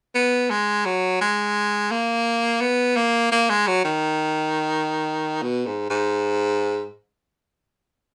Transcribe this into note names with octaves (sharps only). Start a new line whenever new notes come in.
B3
G#3
F#3
G#3
A#3
B3
A#3
A#3
G#3
F#3
D#3
B2
G#2
G#2